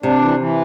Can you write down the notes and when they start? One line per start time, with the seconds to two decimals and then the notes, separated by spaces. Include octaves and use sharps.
0.02 C3 D4
0.21 E3
0.38 E3